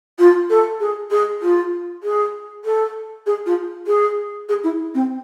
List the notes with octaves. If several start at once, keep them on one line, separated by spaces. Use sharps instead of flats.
F4
A4
G#4
G#4
F4
G#4
A4
G#4
F4
G#4
G#4
E4
C4